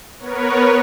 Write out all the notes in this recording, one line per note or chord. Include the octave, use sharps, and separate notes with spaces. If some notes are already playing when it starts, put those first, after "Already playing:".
B3 A#4 B4 C#5